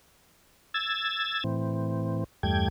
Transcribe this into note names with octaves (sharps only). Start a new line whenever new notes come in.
E6 G#6 A6
A2 E3 C4
E2 G2 G3 A3 G5 G#6